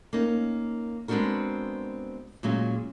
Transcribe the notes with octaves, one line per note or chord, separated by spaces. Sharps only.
A#3 C#4 D#4
G#3 B3 C4 D4 F#4 A#4
A#2 F#3 G#3 C#4